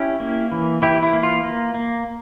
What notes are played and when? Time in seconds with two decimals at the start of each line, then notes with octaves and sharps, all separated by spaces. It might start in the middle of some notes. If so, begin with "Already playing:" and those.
Already playing: C#4 E4 G4
0.20 A#3
0.52 E3
0.82 E3 E4 G4
1.03 E4
1.13 A#3
1.23 F4
1.44 A#3
1.74 A#3